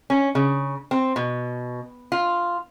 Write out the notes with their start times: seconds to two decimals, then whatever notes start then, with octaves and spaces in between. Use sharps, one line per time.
0.10 C#4
0.35 C#3
0.91 C4
1.16 B2
2.12 F4